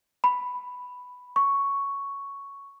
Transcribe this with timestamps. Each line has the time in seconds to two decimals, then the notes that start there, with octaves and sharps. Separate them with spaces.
0.24 B5
1.36 C#6